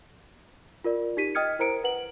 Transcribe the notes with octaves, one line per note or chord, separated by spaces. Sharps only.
F4 A#4 D5
D#4 G4 B6 D#7
D#5 G5 D#6 F6 G#6 C#7
E4 A#4 C5 A#5 C#7 D7
B4 F#5 F#7